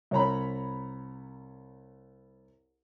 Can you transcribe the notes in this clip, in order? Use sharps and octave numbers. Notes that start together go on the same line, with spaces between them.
C2 C#5 A#5 B5